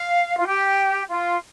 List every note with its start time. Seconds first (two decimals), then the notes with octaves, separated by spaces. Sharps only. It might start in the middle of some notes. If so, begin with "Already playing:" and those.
Already playing: F5
0.37 F4
0.46 G4
1.08 F4